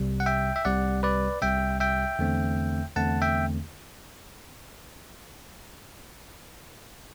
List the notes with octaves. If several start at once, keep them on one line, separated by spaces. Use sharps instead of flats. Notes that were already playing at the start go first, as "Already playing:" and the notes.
Already playing: C2 C3 G3
F#5
E5 G5
E5
C2 C3 G3 D5 F#5
B4 D5
C2 C3 G3 E5 G5
E5 G5
E2 D3 A3 C4
E2 D3 A3 C4 F#5 A5
E5 G5